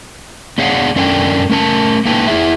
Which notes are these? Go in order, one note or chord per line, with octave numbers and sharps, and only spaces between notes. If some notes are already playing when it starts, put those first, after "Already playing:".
B3 D4 G#4 C#5 F5 F#5
F#2 C#4 D4 A4 A#4 G5
A3 C#4 A#4 A5
A#3 D#4 A4 B4 G5 A5
E4 G#4 E5